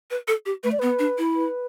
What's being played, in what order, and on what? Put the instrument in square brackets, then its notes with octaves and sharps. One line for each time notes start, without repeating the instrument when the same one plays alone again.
[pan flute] B4
A4
G4
[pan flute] A3 [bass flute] B4
[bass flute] D5
[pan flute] B3 [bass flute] B4
[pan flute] D4
E4
[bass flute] B4